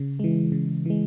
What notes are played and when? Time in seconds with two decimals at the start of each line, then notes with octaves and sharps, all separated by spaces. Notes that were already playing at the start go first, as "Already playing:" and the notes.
Already playing: C#3
0.19 E3 G#3
0.52 C#3
0.86 E3 G#3